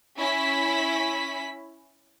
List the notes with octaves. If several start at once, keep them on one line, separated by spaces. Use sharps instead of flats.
C#4 E4 B6